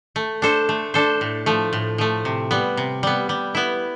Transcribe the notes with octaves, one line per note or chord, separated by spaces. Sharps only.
A3
D4 A4 C5
A3
D4 A4 C5
A2
F3 A3
A2
F3 A3
C3
G3 B3
C3
G3 B3
G3
B3 E4